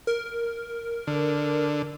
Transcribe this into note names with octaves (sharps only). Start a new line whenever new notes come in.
A#4
D3